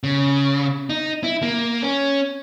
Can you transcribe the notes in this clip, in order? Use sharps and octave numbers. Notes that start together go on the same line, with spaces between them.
C#3
D#4
E4
A#3
C#4